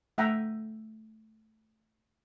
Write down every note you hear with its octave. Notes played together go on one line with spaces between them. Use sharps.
A3 E5 F#5 G5 A#5